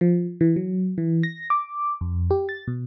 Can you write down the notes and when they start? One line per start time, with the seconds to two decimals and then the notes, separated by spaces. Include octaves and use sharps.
0.01 F3
0.41 E3
0.56 F#3
0.98 E3
1.23 A#6
1.50 D6
2.01 F2
2.31 G4
2.49 A6
2.68 B2